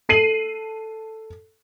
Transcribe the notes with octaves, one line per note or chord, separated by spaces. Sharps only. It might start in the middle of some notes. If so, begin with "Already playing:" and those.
A4 C7 D#7 F#7